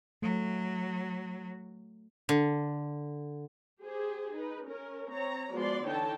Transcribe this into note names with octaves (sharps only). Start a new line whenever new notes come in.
F#3 A3
D3
G4 G#4 C5
D#4 B4
C#4 A#4
C4 C#5 A#5
F3 G#3 B3 F#4 D5 C6
D3 E3 D#4 C#5 G5 A5